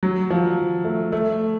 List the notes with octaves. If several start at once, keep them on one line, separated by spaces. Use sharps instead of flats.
F#3
F3
A3
A3